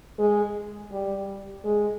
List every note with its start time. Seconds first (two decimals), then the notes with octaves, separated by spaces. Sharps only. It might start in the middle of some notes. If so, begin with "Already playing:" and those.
0.19 G#3
0.92 G3
1.64 G#3